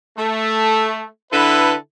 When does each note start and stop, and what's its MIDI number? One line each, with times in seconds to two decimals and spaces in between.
0.17 1.07 57
1.31 1.75 50
1.31 1.75 64
1.31 1.75 69
1.31 1.75 71